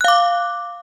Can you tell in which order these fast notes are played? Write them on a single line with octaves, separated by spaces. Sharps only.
F#6 F5 D6